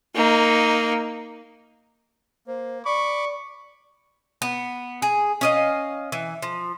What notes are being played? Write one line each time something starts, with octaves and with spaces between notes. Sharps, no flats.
A#3 D#4
A#3 C5
D5 B5 C#6 D6
B3
G#4
C#4 D#5 F5
E3
F3